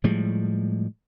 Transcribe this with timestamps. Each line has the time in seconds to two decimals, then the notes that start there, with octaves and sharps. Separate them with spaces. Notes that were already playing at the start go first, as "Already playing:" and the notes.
0.04 A2 F3 G3 G#3